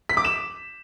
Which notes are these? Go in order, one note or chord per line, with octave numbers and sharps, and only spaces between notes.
B6
D6
E7